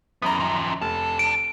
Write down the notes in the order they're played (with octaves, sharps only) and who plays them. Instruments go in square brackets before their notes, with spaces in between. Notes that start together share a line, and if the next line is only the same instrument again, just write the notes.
[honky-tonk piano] F#2 A#5 [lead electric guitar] E3 B3
[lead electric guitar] D#3 F3
[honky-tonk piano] F1 [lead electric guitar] D3 A5
[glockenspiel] D7